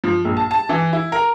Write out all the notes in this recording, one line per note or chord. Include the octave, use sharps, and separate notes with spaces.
F3
A#1
A5
A5
E3
E4
A#4